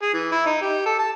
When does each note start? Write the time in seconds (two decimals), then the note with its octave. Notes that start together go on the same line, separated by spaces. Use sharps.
0.02 G#4
0.14 E3
0.32 E4
0.46 D#4
0.62 G4
0.86 A4
0.99 A5